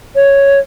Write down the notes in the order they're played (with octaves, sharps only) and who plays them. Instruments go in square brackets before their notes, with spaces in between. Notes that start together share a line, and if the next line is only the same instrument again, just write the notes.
[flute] C#5